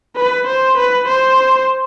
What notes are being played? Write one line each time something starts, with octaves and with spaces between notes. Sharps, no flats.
B4
C5
B4
C5